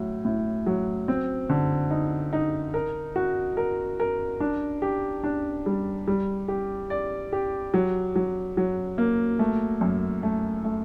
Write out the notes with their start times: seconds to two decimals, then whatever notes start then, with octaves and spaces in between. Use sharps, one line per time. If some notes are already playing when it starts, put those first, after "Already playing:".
Already playing: A2 F#3
0.25 A2
0.67 F#3
1.08 C4
1.50 D3
1.91 D#4
2.33 D#4
2.74 A#4
3.16 F#4
3.57 A#4
4.00 A#4
4.40 D4
4.82 G4
5.24 D4
5.66 G3
6.08 G3
6.48 G4
6.90 D5
7.33 G4
7.74 F#3
8.16 F#3
8.57 F#3
8.98 A#3
9.39 A3
9.81 F#2
10.23 A3
10.64 A3